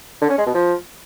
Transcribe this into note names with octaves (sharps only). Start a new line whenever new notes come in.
D3
C#4
G#3
B2
F3